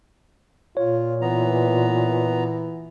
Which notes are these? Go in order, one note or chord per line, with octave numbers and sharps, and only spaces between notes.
A#2 F4 C#5
E3 B3 A#5